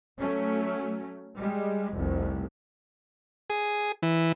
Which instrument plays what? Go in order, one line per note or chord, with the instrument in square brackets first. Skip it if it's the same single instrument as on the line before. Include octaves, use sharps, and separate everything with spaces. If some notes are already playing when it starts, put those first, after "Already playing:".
[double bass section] F#3 A3 C#4
G3 G#3
F1 C2
[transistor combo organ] G#4
E3